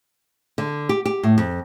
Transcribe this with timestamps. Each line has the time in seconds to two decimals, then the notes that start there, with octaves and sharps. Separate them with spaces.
0.58 D3
0.89 G4
1.05 G4
1.23 A2
1.38 F2